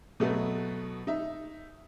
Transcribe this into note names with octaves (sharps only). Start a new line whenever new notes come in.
B2 F#3 A3 B3
D#4 E5